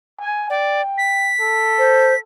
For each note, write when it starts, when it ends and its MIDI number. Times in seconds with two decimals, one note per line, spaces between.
0.20 0.46 80
0.50 0.82 74
0.50 1.30 79
0.98 2.19 95
1.41 2.23 69
1.79 2.14 72